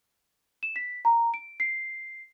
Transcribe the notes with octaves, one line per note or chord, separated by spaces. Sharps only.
E7
B6
A#5
D7
C7